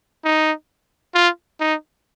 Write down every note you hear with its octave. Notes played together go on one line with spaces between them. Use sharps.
D#4
F4
D#4